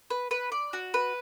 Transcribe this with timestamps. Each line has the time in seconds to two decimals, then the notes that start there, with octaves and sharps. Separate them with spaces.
0.10 B4
0.31 B4
0.52 D5
0.73 F#4
0.94 B4